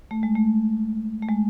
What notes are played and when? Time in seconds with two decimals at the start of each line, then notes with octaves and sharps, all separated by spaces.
0.11 A3
0.23 G#3
0.35 A3
1.22 A3
1.29 G#3